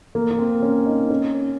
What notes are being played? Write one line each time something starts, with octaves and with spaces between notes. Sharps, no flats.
A#3
A#3
C4
C#4
D#4
C#4